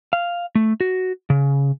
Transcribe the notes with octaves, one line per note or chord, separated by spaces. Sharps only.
F5
A3
F#4
C#3